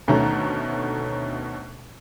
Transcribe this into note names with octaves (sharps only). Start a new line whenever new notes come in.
D2 B2 D#3 A3 C#4 A#5